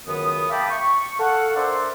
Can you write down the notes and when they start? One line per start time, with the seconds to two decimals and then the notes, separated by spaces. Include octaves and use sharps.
0.07 C#2 F#2 D#3 B3 D#6
0.50 E5 F5 G5 A5 B5 D6
0.70 C#6
1.19 A4 F5 F#5
1.56 D4 A#4 C5 D5 E5 C6